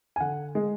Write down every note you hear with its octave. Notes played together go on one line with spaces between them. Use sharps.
G#5
D3 F#5
G#3